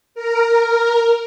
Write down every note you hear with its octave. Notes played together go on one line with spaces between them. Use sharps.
A#4